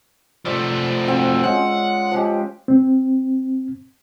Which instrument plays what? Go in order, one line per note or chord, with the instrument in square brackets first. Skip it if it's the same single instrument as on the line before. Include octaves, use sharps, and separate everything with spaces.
[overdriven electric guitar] F3 A3 [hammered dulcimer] C5 D5 E5
[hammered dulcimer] C4 F#4 F5
[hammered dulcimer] G#3 C#4 F4 [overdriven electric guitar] F#5
[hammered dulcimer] F3 G#3 G4
[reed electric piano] C4